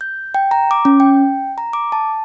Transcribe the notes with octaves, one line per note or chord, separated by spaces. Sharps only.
G6
G5
A#5
D6
C#4
G5
A#5
D6
A5